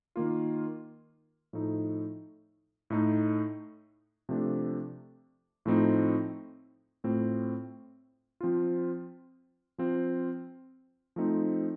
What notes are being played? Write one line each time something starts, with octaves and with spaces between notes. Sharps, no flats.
D#3 A#3 F4
A2 F3 A3 D#4
A2 A3 D#4
C3 F3 A3 D4
A2 F3 A3 C4 D#4
A2 A3 C4 F4
F3 C4 F4
F3 C4 F4
F3 A3 C4 D#4